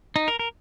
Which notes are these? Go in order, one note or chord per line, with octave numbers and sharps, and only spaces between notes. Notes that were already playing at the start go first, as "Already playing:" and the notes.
D#4
A#4
A#4